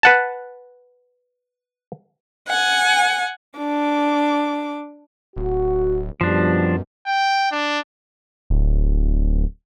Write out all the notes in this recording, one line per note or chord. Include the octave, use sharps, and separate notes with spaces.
B4 F#5 A5
F#5 G#5
D4 D6
D1 F#4
F#2 B2 F3 G3 D4
G5
D4
D1